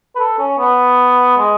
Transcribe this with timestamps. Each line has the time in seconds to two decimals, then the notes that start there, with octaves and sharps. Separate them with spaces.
0.15 B4
0.19 A4
0.38 C#4
0.58 B3
1.37 G#3